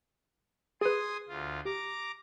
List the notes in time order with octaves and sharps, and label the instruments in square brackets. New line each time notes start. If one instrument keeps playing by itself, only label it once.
[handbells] G#4 B4 [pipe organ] G#5 C6 D#6
[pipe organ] D2 F4
[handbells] G4 [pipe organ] A#5 D6